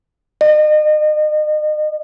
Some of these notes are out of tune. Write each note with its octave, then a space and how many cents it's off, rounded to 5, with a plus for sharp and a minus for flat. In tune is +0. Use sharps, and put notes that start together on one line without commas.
D#5 -35